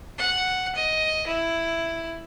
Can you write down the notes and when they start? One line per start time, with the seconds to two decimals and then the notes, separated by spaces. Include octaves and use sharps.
0.18 F#5
0.75 D#5
1.27 E4